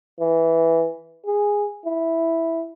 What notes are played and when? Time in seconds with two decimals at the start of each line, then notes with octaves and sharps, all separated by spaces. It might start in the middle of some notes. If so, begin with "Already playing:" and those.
0.19 E3
1.26 G#4
1.85 E4